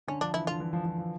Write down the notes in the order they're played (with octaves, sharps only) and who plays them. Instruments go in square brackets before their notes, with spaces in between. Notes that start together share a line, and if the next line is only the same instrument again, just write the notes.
[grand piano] D3 [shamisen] C#4
[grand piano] F3 [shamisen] D4
[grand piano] E3 [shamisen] E4
[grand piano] D3 [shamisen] F4
[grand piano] E3
F3
F3
F3